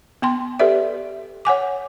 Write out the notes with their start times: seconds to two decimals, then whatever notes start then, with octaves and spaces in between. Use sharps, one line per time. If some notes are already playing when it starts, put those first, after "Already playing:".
0.22 B3 G5 C6
0.59 G4 A4 B4 D5 E5
1.45 C#5 F#5 G#5 D6